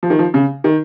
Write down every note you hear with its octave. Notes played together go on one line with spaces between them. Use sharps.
F3
D#3
F3
C#3
D#3